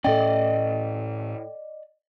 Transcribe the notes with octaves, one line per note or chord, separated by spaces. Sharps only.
A2 C#4 A4 D5 D#5 G5